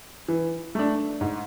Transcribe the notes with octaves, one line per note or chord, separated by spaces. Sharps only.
E3
A3 D4
G#2